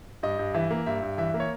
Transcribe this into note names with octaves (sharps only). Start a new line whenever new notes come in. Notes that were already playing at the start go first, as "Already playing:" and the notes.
G2 D#5
G2
E3 E5
A#3
G2 E5
G2
E3 E5
A#3
C#5